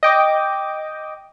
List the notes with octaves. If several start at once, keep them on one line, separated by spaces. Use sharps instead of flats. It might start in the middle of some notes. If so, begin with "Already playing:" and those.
D#5 G5 D6